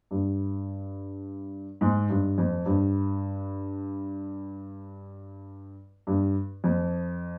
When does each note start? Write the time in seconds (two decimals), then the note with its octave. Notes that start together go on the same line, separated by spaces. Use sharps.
0.11 G2
1.81 G#2
2.10 G2
2.38 F2
2.66 G2
6.07 G2
6.64 F2